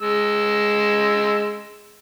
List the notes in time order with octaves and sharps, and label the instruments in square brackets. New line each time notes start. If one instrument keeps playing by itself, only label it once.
[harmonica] G#3 E6